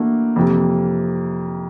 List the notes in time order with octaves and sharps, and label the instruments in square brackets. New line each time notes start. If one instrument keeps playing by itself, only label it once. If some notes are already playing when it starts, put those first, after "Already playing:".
Already playing: [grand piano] E3 A3 D4 F#4 [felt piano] A#3
[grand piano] F2 C3 E3